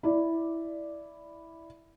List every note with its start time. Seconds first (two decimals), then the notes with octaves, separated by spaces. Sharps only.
0.03 E4 D5